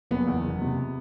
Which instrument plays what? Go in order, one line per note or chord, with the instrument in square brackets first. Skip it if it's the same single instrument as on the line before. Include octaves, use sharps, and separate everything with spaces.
[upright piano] F#1 B3
E2
F#1
C3